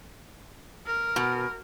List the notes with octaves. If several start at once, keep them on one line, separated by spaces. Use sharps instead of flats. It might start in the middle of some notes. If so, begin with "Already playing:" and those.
A#4
B2